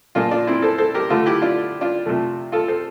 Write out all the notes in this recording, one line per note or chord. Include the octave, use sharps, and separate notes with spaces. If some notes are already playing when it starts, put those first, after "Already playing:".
A#2 F3 A#3 D4 F4
D4 F4
C4 E4
A4 C5
A4 C5
G4 A#4
D3 A3 F4 A4
E4 G4
D4 F4
D4 F4
C3 F3 A3
F4 A4
A4 C5